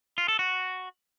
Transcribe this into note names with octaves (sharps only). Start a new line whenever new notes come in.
F4
A4
F#4